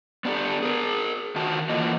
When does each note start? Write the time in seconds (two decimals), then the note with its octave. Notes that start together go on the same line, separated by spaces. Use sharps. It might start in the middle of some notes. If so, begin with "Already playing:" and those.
0.25 B3 D4 D#4 F4 G4 A4
0.62 G#4 A#4
1.36 D#3 F#4 A5
1.69 E3 A3 A#3 F4 D#5